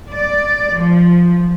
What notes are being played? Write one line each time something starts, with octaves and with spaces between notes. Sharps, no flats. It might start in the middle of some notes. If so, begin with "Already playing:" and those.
D5
F3